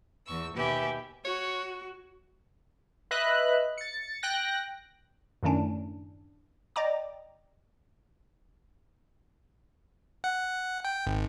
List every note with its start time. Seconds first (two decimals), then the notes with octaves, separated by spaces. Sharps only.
0.25 E2 C#6 E6
0.54 D#2 B2 G4 B4 E5 G#5
1.25 F#4 C#5
3.11 B4 D#5 E5 F#6
3.78 A6 C#7
4.23 G5 F#6 A#6
5.43 F#2 A2 D#3 A3 C#4 D4
6.76 D5 D#5 G5 A#5 D6
10.24 F#5
10.85 G5
11.07 G#1